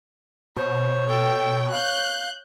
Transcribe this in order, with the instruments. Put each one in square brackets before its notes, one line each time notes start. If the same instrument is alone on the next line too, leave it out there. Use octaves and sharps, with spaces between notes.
[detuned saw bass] B2 [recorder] C5 [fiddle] C#5
[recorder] A4 [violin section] G5
[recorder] F5 [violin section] F#6 G6